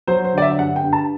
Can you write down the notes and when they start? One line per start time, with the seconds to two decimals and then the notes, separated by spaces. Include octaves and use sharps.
0.07 F#3 C5
0.24 C5
0.33 D3 D5
0.42 E5
0.59 G2 F#5
0.76 G5
0.84 G2
0.93 A5